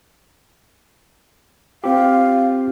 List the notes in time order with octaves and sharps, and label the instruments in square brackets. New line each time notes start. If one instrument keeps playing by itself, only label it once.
[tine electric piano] C4 F4 G4 [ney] F5